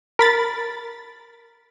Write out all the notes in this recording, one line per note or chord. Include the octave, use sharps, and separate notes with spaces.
A#4 B5 A6